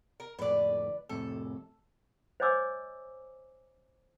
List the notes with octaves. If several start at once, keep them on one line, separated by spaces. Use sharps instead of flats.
A#4
F2 A2 D3 B4 D5
F2 A2 C3 A4
C5 C#5 D#5 G#5 D6 E6